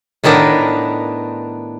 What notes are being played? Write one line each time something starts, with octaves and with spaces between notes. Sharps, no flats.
A2 D#3 B3 D4 A#4